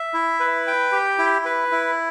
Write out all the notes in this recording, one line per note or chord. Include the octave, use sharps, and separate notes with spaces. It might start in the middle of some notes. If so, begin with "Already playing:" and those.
Already playing: E5
E4
B4
G5
G4
E4
B4
E4